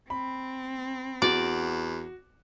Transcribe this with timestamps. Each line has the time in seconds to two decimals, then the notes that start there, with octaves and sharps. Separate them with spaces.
0.10 C4 B5
1.22 E2 F#4 D5